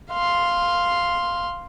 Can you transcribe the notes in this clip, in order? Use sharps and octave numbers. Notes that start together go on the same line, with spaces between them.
F5 C6